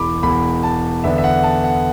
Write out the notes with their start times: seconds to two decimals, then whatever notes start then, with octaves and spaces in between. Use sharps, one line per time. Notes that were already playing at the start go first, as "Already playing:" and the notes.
Already playing: E1 E2 E3 B5 D6
0.23 E1 E2 E3 B5
0.63 A5
1.04 E2 D3 B3 D4 E5
1.18 E5
1.24 F#5
1.43 A5
1.64 F#5